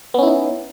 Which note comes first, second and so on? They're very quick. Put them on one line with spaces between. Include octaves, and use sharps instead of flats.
B3 C#4 E4 D#4